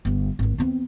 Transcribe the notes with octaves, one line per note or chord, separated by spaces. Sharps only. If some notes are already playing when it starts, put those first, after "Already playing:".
G1 G3
G#1 E4
E2 C4